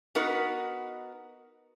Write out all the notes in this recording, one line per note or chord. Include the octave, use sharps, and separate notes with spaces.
B3 D#4 F#4 A#4 B4